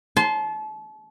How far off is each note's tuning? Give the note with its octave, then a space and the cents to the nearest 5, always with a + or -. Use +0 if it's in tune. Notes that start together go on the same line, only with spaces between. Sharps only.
A5 -35 C6 +0